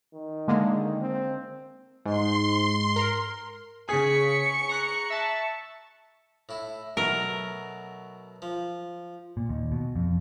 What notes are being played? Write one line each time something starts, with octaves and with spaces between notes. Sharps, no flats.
D#3
D3 G#3 A#3
C4
G#2 C6
A#4
C#3 G#4 C#6 B6
A#5 F#6
E5 A5
A2 E4
B2 F#3 A3 A#4
F3
A#2
D#2
B2
F2